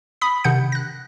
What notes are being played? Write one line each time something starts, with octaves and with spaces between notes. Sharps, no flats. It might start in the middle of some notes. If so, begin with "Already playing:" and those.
B5 D#6 B6
C3 D#3 D4 F#5 G6 C#7
F#6 A#6